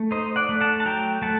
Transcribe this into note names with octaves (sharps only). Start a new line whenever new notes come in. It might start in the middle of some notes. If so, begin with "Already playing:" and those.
Already playing: A3
D#4 C5 D#5
D5 F#5
A3
F#5 A5
A5
F#3 G5 A#5
A3 F#5 A5